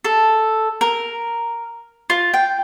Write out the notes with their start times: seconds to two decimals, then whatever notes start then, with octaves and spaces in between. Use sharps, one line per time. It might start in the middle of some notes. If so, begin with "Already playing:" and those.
0.05 A4
0.81 A#4
2.10 F4
2.34 G5